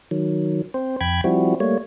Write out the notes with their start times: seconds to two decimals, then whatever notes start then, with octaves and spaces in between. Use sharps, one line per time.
0.11 D#3 F#3
0.74 C4 C5
1.01 F2 G5 B5 G#6
1.24 F3 G3 C4 E4 F#4
1.60 G3 A3 A#3 C#5